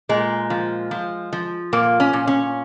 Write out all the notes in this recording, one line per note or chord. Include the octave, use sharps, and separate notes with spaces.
A#2 G#3
F3
F3
F3
A#2 A#3
C#4
A#2
C#4